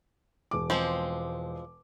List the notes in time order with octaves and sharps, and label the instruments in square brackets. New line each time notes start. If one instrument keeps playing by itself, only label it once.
[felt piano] E1 D6
[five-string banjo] F3 G#3 C4